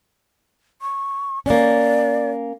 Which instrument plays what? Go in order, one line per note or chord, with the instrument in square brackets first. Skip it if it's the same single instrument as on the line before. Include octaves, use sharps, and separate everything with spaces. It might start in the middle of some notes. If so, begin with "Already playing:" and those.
[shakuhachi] C#6
[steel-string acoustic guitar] A#3 C#4 [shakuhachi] D5